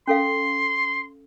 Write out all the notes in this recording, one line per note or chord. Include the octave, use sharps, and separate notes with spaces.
C#4 A4 F5 C6